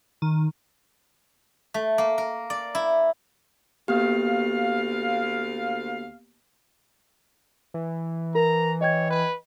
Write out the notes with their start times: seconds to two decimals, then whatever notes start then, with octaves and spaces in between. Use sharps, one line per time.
0.22 D#3
1.74 A3
1.98 A#3
2.18 A#4
2.50 D5
2.75 E4
3.88 D2 A#3 B3 G4 F5
7.74 E3
8.35 A#4 A#5
8.81 C#5 D#5 G5 G#6
9.10 B4